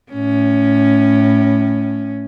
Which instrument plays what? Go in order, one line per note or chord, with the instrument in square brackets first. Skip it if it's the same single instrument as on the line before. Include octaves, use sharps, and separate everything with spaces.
[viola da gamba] A2 C#4